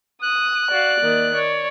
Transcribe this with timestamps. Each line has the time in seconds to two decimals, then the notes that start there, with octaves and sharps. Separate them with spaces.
0.22 D#6 F#6
0.71 F#4 D5 F5
1.00 D#3 A#3
1.35 C#5 D5